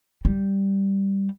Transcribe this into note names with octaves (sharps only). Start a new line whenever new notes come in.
G3